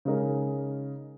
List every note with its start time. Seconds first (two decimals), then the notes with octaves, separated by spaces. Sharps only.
0.05 C#3 G#3 D#4 A#4